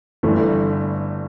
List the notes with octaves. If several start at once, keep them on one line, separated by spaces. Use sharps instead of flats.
G1 G2 E3 A3